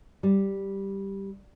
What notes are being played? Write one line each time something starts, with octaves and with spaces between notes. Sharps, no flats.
G3